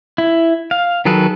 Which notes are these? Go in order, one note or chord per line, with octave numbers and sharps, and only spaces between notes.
E4
F5
D#3 F#3 G#4 A4 B4